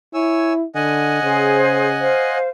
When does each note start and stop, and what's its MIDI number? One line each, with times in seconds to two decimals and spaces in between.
0.14 0.65 64
0.14 0.53 73
0.14 0.53 80
0.14 0.53 88
0.75 1.19 50
0.75 2.38 75
0.75 2.38 78
0.75 2.38 80
1.23 2.12 49
1.23 1.89 68
1.23 1.89 72
2.00 2.47 72
2.00 2.47 77